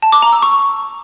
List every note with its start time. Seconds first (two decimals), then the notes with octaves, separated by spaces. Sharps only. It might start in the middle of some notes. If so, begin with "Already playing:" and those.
0.02 A5
0.12 D6
0.22 A#5
0.32 E6
0.42 C#6